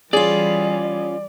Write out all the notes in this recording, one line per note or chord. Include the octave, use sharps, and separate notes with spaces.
E3 G3 C#4 F4 G#4 D5